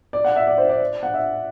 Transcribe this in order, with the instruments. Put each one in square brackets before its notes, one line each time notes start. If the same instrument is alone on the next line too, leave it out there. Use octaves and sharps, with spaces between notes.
[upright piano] D5
F#5
E5
D5
C5
D5
F#5
E5